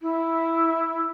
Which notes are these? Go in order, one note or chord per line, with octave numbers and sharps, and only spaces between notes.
E4